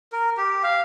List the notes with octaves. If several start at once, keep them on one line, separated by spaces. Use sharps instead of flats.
A#4
G4
F5